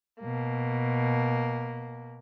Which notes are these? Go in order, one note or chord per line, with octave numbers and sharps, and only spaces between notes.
B2 A#3